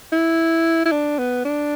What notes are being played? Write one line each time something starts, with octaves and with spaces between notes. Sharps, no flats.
E4
E4
D4
B3
D4